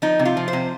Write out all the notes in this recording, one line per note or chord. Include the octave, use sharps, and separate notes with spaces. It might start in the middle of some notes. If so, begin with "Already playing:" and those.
F3 D#4
C3
F4
F3
C5
C3